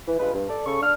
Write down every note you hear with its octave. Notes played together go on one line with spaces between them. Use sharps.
E3
G2 G#3 F4 B4
G2
A4 D5
C#3 A4 C#6
D4 F6